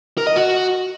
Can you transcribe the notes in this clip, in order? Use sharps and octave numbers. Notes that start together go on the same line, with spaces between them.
A#4
D#5
F#4